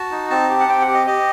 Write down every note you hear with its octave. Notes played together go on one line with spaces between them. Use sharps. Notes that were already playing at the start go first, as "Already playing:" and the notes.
Already playing: F#4 A5
D#4
C4 A5
G4
F#5
C4 G5
F#5
G4
D#5
G4 D#5